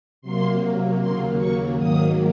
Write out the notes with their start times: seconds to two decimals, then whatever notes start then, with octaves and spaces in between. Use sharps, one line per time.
0.22 C3 F#3 A#3 C6
0.98 D#2 C#3 F#3 A#3 C6
1.37 C#6
1.76 G#2 D#3 F#3 A#3 D#6